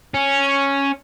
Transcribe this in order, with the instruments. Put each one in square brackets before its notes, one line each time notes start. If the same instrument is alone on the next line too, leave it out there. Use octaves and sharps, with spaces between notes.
[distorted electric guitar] C#4